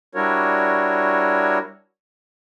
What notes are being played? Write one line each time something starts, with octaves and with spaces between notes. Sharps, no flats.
G3 D4 E4 F#4 A#4 C#5